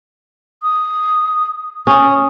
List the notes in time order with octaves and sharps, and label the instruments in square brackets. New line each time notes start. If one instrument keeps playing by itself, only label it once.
[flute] D#6
[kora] C#4 [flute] D#6